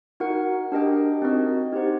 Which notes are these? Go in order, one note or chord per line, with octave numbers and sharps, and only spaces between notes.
D#4 F#4 A#4 F#5
D4 G4 A#4 D#5 G5
C4 D#4 F#4 A#4 D#5
D#4 G4 C5 F#5